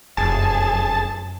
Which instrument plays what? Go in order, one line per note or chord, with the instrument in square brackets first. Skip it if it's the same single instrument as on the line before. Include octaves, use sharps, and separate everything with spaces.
[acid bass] F1 [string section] F#2 [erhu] G#4 [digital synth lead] A5